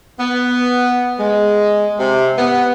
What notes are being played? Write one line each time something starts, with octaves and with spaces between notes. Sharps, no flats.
B3
G#3
C3
B3